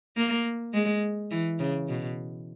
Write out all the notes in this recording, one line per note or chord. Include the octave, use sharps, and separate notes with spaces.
A#3
G#3
E3
C#3
B2